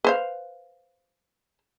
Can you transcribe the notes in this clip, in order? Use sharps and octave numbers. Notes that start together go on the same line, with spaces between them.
B4 C5 F5